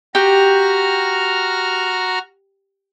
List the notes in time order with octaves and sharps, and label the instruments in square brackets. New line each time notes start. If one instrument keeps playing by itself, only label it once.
[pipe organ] F#4 A#5 F6 [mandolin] G4